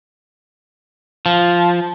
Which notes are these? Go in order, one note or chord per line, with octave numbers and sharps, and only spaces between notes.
F3